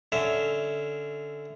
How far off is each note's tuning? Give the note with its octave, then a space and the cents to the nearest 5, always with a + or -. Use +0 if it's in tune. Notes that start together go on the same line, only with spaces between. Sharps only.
D3 +0 C#4 +0 E5 -10